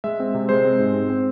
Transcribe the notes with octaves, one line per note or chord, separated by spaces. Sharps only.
G#3 E5
C4
C3
G#3 C5
C4
G#2
C4
C4